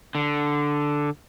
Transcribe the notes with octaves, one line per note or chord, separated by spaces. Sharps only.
D3